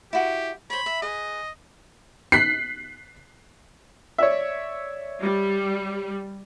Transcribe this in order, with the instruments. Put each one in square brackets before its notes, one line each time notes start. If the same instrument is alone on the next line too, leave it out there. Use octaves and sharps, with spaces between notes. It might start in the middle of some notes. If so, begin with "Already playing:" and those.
[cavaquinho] E4 F#4 [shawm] G4
[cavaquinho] C5 C#5 [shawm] B5
[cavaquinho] E5
[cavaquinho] G#4 B4 [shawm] D#5
[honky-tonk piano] F#6 B6 C7
[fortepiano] C#5 D5 E5
[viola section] G3